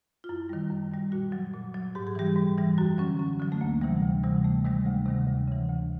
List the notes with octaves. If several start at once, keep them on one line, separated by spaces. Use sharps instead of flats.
F4
F#2 E4
D#3 G3
F#2
D#3 G3
A#2 F#4
F#3
A#2
F#3
G#2 G4
G#4
E3 G3 G4
G#2
E3 G3
F#2 F#4
D3 F#3 C#4
F#2 C#4
D3 F#3
A3
D2 A#3
C3 E3 G3
D2
C3 E3 G3
D2 A3
C3 D#3 G3 G#3
D2 A3
C3 D#3 G3
D2
C#3 E3
D2